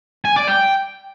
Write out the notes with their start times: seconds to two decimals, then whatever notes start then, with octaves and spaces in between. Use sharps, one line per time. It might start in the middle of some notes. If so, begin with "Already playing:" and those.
0.25 G#5
0.36 D5
0.47 G5